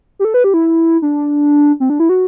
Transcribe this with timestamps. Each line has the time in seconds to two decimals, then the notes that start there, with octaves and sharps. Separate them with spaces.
0.19 G4
0.25 A4
0.34 B4
0.44 G4
0.54 E4
1.02 D4
1.80 C4
1.90 D4
2.00 E4
2.09 F#4